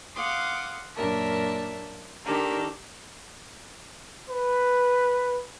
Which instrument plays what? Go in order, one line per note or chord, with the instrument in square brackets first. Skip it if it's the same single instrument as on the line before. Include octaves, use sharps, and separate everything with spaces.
[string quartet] F5 F#5 C6 D6 D#6
F#2 A#2 D4 A#4 E5 A5
D#3 D4 G4 A4 A#4
[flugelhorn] B4